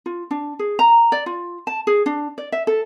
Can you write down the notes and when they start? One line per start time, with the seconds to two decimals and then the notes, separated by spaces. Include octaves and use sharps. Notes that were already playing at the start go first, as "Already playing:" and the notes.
0.06 F4
0.31 D4
0.59 G#4
0.79 A#5
1.12 D5
1.26 F4
1.67 A5
1.87 G#4
2.06 D4
2.38 D5
2.52 E5
2.67 A4